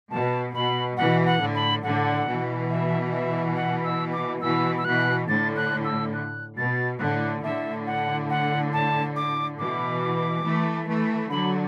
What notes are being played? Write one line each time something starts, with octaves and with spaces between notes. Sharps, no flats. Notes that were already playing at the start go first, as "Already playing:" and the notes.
B2 A5
B2 B5
B2 E3 F#5
F#5
A2 D3
B5
A2 D3 F#5
B2 E3
E5
E5
F#5
E6
D6
B2 E3 E6
E6
B2 E3 F#6
A2 D3 A6
F#6
E6
F#6
B2 A6
A2 D3 F#6
A2 D3 E5
F#5
F#5
A5
D6
B2 E3 D6
E3 A3
E3 A3
D3 F#3 B5